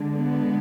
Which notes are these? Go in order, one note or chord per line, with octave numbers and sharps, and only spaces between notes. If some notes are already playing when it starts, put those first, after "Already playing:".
Already playing: D3 G#3
B3